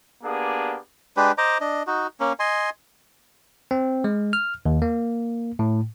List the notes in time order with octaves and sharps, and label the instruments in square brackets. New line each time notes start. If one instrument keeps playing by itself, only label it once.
[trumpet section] A#3 B3 D4 G4 G#4
[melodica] G#3 D4 G4 B4
C5 D#5 A#5 D6
D4 D#5
D#4 F#4
A#3 C#4
D#5 G#5 C6
[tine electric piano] C4
G#3
F6
D#2
A#3
A2